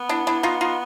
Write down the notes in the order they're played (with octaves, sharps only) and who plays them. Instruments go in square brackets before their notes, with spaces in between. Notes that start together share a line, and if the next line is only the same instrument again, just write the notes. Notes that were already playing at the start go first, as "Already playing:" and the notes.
Already playing: [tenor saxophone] B3
[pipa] D4 E4
D4 E4
D#4 F4
D#4 F4